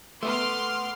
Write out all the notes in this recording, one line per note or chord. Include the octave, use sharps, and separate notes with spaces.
A3 B3 C6 D6 F6